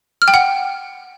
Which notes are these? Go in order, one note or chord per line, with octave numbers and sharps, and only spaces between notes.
F6
G5
F#5